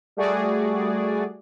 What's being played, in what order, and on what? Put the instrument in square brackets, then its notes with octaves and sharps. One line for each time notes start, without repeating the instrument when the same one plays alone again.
[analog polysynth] G3 A3 F#4 G#4 D5